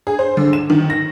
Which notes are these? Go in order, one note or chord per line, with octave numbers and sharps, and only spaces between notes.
G#4
C5
D3
E7
D#3
A#6